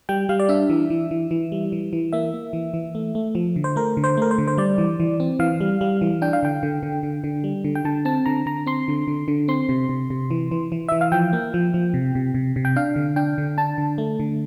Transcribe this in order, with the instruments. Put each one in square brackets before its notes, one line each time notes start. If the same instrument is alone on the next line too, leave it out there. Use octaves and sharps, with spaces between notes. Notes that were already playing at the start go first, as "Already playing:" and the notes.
[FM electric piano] G3 G5
G3 F5
D5
D4 E5
E3
E3
E3
E3
G3
E3
E3
A#3 E5
A#3
E3
E3
A3
A3
F3
D3
C5
A3 A#4
D3
C5
A3 A#4
C5
D3
C5
G3 D5
E3
E3
C4
E3 F5
G3
G3
E3
D4 G5
F5
D3 G5
D3
D3
D3
D3
G3
D3
G5
D3 A5
C4 A5
D3 A#5
D3 A#5
C4 C6
D3
D3
D3
C4 C6
C3
C3
C3
E3
E3
E3
E3 E5
F5
F3 G5
A#3
F3
F3
C3
C3
C3
C3
G5
D4 F5
D3
D4 G5
D3
D4 A5
D3
A3
D3